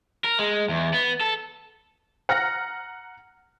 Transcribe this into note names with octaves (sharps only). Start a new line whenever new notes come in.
A#4
G#3
E2
B3
A4
F#5 A#5 F6 A#6